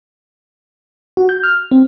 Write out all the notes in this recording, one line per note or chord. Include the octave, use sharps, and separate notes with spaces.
F#4
G6
F6
C4